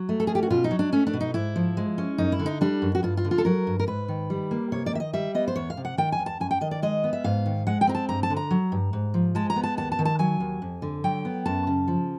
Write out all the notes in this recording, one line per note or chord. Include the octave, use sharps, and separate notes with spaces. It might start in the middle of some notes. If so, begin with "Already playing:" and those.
Already playing: F#3
A3
A4
C#4 G#4
G4
F#4
B2 F4
D#4
F#3
D4
A3 C#4
D4
B2
D#4
G#2 E4
F3
G#3
C#4
F#2 D#4
E4
D3
D#4
G3 D4
F#2
F#4
G2 F4
F4
D3
F4
A4
F#3 A#4
G2
A#4
G#2 B4
D#3
G3
A#3
C3 C#5
D5
D#3 E5
D#5
G3 E5
B3 D#5
C5
E2 C#5
F5
C3
F#5
D#3 G5
G#5
E2
A5
F#2 G#5
G5
D#3 D#5
D5
G#3 D#5
B3
E5
G#2 F5
D#3
G#3 F#5
G5
C4 A#5
A5
G2 A#5
A5
D3
A#5
F#3
G2
G#2
F3
G#3 A5
A#5
B3
A5
D#2 A5
A5
D#3
A5
F#3 G#5
D#2
F2
D3
F#3 G5
B3
F#2 A5
C#3
F3